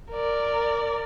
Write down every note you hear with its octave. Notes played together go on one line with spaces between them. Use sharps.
A#4 D5